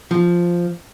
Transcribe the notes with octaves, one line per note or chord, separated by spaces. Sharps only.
F3